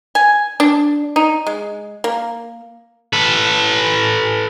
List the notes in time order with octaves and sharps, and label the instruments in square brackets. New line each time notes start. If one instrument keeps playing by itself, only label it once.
[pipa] G#5
D4
D#4
G#3
A#3
[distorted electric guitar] A4 B4